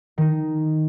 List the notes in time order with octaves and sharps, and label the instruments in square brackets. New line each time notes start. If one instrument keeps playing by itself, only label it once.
[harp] D#3 D#4